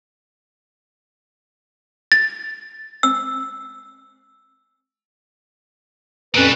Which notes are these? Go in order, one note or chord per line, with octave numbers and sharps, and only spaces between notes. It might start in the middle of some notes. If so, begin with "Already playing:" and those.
A6
E6
F2 A#2 G3 C#4 B4